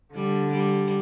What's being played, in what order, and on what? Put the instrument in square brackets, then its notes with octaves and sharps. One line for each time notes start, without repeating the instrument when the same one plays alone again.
[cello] D3 [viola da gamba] G3
[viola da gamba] G3